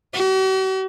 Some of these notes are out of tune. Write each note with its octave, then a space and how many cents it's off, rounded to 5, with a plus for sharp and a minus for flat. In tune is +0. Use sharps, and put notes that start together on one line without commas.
F#4 +45